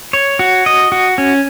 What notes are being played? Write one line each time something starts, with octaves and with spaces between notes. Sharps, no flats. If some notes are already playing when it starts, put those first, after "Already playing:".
C#5
F#4
D#5
F#4
C#4